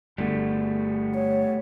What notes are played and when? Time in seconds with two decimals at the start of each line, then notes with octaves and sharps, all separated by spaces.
0.18 G1 G3 A3 B3
1.15 C#5